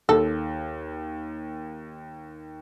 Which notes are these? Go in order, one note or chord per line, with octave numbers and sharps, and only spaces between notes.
D#2 A4